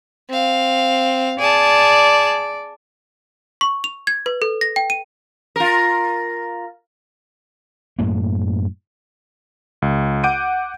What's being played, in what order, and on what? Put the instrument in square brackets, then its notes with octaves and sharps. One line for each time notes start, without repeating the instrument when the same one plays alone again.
[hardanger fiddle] C4 F5
[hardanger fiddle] G#4 A5 [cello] D5
[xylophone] C#6
F7
G#6
B4
A4
A#6
G5
D#7
[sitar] F4 A#4
[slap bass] F#2 A2 A#3
[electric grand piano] C#2
F#5 D6 G6 D7 D#7